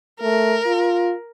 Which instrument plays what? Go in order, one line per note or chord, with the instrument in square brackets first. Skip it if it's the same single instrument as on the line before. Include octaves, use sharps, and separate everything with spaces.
[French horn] A3 [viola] A#4
[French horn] F4